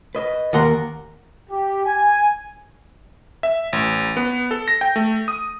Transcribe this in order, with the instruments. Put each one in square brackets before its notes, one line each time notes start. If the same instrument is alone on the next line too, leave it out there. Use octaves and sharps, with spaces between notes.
[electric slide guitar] B4 D#5
[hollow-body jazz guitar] D#2 F#5 C6 [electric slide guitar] A#4
[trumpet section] G4
G#5
[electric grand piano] E5
A1
B3
A4
A#6
G5
A3
D#6